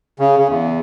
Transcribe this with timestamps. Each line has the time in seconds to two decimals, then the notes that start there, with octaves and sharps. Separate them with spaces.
0.19 C#3
0.38 C#3
0.49 E2